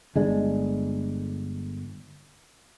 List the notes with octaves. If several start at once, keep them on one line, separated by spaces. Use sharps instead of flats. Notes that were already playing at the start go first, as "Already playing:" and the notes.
G1 G#3 D4